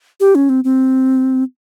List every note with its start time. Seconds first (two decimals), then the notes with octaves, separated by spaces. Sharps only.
0.20 G4
0.35 C#4
0.49 C4
0.64 C4